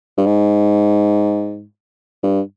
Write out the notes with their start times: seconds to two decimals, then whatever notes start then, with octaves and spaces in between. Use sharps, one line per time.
0.18 G2
0.26 G#2
2.23 G2